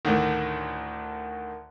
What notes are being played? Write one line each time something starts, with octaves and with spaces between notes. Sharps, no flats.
D2 A2 D3 D#3